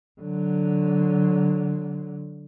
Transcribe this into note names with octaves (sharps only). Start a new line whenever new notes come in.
D3 F#3